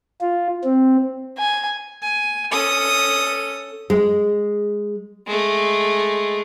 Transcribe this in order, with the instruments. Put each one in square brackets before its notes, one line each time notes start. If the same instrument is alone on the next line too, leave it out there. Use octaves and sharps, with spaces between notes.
[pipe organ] F4
C4
[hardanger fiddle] G#5
[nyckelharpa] G#5
[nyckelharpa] C#4 A4 [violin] D#6
[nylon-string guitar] G#3
[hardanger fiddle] G#3 A3